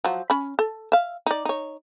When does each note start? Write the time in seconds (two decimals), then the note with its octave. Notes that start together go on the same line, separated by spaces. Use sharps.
0.04 F3 F#3
0.30 C#4 B5
0.59 A4
0.92 E5 F5
1.26 D#4 D5
1.45 D#4 C#5